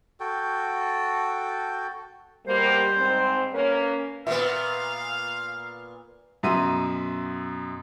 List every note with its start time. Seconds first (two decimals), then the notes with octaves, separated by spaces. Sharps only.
0.20 F#4 A4 G5
2.46 B2 G3 A#3 G4 C5
2.97 G#2 C4
3.53 A#3 C#4 A#4 B4 C#5
4.27 A#2 B3 E5 F5
6.43 F#2 B2 E5 A#5 C6 D#7